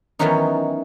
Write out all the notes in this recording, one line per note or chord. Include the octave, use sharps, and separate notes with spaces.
D#3 E3 F#3 B3 C#4 D#4